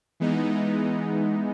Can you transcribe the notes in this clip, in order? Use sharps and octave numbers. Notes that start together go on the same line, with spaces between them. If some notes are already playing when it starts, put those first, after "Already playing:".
E3 G#3 B3 D#4